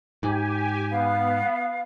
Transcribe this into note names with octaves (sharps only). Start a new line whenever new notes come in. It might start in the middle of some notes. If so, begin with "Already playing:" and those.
G#2 G4 G#5
B3 F5